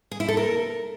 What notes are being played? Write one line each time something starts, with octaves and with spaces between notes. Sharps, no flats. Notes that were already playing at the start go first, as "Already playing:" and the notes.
G#4
E4
A4
A#4